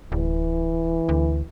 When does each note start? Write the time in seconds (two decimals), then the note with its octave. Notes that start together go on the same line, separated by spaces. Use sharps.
0.12 D1 E3
1.09 D2